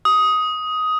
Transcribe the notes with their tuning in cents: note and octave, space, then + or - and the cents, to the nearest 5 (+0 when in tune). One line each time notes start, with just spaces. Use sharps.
D#6 +10